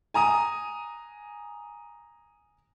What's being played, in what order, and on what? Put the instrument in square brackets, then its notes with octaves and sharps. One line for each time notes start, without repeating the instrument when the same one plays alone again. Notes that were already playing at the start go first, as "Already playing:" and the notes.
[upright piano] G#5 A#5 D#6 D#7